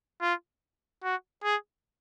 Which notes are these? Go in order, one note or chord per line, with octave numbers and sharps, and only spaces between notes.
F4
F#4
G#4